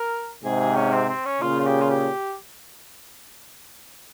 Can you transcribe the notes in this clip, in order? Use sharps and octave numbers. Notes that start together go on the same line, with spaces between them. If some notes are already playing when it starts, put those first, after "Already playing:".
Already playing: A#4
G#2 C3 G#4
G#4
C#4
C4
C4
C#4
A#2 C#3 F4
F4
G4
F4
G4